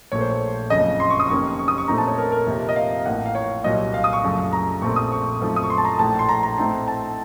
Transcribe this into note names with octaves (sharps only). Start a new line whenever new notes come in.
A#1 A#2 A3 C#5
C5
C#5
F#1 F2 C#3 F3 D#5
C6
C#6
D#6
F1 F2 D#3 A#3 C#4 C#6
C#6
D#6
C#6
A#2 A3 C4 D#4 A#5
A5
C#5
A#4
A#4
F2 C3 F3 A#3
D#5
F5
A1 A2 F3 A#3 F#5
F5
C#5
C2 A#2 F#3 D#5
F5
D#6
C#6
F#2 C#3 F3 A3
A#5
A#1 A#2 A3 C4 C#6
D#6
C#6
F#2 F3 A3 C4 D#4
D#6
C#6
C6
A5
A#5
A#1 A2 A3 A5
C6
A#5
A#5
A2 A3 C4 D#4 C6
A5